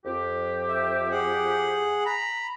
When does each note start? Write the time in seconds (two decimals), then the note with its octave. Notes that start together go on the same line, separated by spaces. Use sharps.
0.05 F2 G4
0.68 E5
1.11 G#4 F#5
2.06 A#5 B5